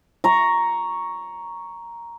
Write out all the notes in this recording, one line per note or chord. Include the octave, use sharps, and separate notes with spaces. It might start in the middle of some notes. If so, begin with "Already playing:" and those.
A#5 C#6